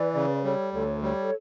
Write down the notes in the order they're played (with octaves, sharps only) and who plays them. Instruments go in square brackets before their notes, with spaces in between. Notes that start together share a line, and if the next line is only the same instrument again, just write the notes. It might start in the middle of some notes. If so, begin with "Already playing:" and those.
Already playing: [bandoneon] E3 [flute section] B4 D5
[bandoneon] C#3
[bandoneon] G3 [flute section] A4 C#5
[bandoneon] D2 [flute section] A4 C#5
[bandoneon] G3 [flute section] A4 C#5